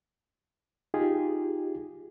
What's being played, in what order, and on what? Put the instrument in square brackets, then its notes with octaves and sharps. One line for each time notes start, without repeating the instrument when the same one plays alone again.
[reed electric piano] D#4 F4 G4 G#4